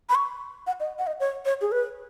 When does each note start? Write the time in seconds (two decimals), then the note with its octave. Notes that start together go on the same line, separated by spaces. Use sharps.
0.09 B5
0.15 C#6
0.67 F#5
0.80 D#5
0.99 F#5
1.07 D#5
1.20 C#5
1.45 C#5
1.61 G#4
1.72 B4